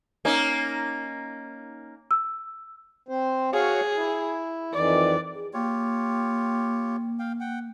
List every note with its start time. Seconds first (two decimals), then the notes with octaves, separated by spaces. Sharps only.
0.25 A#3 C#4 D#4
2.11 E6
3.09 C4 C5
3.53 F#4 G#4 C#5 F5
3.96 E4
4.73 F2 D#3 E3 D5
5.33 G#4
5.54 A#3 F4 G4 C#5
7.19 F5 G5
7.40 F#5 G5